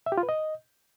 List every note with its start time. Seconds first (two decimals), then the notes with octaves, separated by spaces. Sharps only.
0.06 E5
0.12 G4
0.18 F4
0.23 B4
0.29 D#5